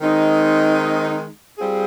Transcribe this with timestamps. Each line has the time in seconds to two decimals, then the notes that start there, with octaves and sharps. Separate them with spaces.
0.01 D#3 G#3 C4 D#4
1.59 G3 C4 F4 G#4